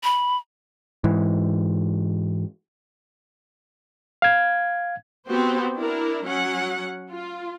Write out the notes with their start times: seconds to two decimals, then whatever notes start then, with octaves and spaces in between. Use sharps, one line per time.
0.04 B5
1.04 G#2 E3
4.22 F5 G#6
5.27 B3 C4 F#4 G4 C5
5.76 D4 E4 A#4
6.25 F#3 C#4 F#5
7.11 F4